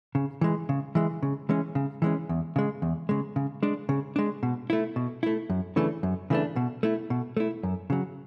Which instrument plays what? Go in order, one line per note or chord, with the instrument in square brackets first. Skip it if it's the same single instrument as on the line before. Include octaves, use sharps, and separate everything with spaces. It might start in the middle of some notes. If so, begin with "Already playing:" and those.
[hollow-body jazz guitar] C#3
E3 G#3
C#3
E3 G#3
C#3
E3 G#3 C#4
C#3
E3 G#3 C#4
E2
C#3 G#3
E2
C#3 G#3
C#3
G#3 D4
C#3
G#3 D4
B2
A3 E4
B2
A3 E4
F#2
C#3 E3 A3 D4
F#2
C#3 E3 A3 D4
B2
A3 E4
B2
A3 E4
F#2
C#3 F#3